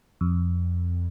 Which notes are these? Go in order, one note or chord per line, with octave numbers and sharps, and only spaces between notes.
F2